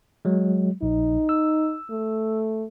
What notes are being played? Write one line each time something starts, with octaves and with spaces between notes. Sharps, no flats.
F#3 G#3
A#1 D#4
E6
A3